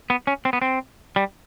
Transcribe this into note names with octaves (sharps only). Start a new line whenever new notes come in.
B3
C#4
C4
B3
C4
G3